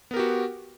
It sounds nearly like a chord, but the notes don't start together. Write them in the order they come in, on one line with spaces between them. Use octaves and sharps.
B3 A#4 G4 F#4